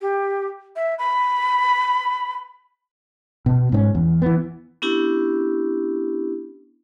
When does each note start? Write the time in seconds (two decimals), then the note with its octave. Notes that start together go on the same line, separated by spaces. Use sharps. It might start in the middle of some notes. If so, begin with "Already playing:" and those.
0.01 G4
0.76 E5
0.98 B5
3.46 B2
3.72 G#2 C4 C#4
3.95 E2
4.22 E3 B3
4.82 B3 C#4 D4 E4 G4